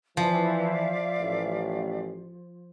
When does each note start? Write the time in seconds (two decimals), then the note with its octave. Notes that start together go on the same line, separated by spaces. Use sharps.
0.17 E3 F3 D5 E5 F5
1.20 A1